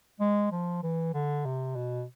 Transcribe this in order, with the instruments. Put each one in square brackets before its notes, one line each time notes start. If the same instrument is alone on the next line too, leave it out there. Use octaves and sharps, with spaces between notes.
[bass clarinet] G#3
F3
E3
D3
C3
B2